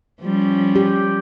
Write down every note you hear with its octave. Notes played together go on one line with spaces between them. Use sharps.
F3 G3 C#4
G4